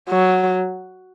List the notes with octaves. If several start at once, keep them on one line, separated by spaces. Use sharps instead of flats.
F#3